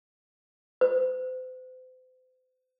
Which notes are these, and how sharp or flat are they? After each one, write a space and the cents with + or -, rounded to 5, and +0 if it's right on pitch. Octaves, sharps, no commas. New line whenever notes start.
C5 -40